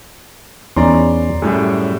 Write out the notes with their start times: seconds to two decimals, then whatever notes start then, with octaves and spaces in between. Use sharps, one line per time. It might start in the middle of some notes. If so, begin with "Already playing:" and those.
0.76 E2 C#4 D#4 D5 A#5 C6
1.42 F#2 A2 G3 G#4